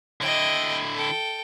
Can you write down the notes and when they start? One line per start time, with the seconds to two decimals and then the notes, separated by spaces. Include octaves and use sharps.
0.21 D3 E4 D#5 G5
0.94 A4 G5